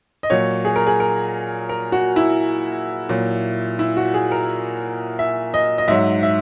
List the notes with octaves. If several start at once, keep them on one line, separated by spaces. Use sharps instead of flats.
D#5
A#2 F#3 C#5
G#4
A#4
G#4
A#4
A#4
F#4
E4
A#2 F#3
E4
F#4
G#4
A#4
E5
D#5
D#5
G#2 F#3 E5
E5